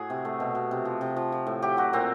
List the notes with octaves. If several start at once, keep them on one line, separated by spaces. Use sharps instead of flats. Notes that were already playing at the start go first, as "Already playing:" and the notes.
Already playing: A2 F#4 G#4
C3
A3
B2
B2
C3
F3
C3
F3
F3
A2
F#3 G4
F#3 F#4
A#2 C4